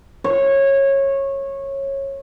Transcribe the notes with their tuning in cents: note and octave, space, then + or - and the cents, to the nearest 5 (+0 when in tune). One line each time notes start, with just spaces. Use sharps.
C#5 -20